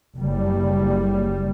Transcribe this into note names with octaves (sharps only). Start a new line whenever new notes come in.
F#1 G3